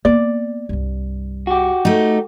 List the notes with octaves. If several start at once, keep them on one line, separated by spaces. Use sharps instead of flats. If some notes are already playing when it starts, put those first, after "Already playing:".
A#3 B3 D5
C2 G2
F#4 G4
A3 D#4